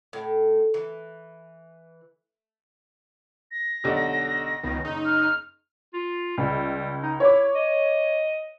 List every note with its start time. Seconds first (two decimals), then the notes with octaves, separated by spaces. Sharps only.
0.13 A2
0.74 E3
3.51 A#6
3.84 B1 D3 G4
4.64 C#2 B2 D#3
4.85 F#1 D#4
5.05 F6
5.93 F4
6.38 C#2 G3
7.03 D#4
7.20 E4 C#5 D6
7.55 D#5